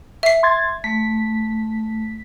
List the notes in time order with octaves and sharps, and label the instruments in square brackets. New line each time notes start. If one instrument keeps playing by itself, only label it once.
[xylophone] E5 C7
[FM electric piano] C6 G#6 A6
[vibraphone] A3 [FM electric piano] B6